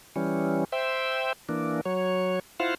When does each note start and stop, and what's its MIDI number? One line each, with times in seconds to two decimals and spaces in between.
0.16 0.64 52
0.16 0.64 55
0.16 0.64 61
0.72 1.33 72
0.72 1.33 76
0.72 1.33 79
1.49 1.81 52
1.49 1.81 58
1.49 1.81 62
1.86 2.39 54
1.86 2.39 73
2.60 2.75 64
2.60 2.75 65
2.60 2.75 72
2.60 2.75 77
2.60 2.75 78